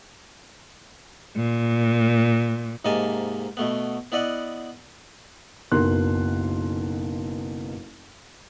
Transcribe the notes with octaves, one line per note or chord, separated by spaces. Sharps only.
A#2
G#2 C3 A#3 D#5 G#5 A5
B2 A3 B3
B3 E4 D5 D#5 F#5
F#1 B1 B2 A#4 C6 F#6